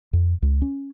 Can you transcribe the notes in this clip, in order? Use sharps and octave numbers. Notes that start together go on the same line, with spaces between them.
F2
C#2
C#4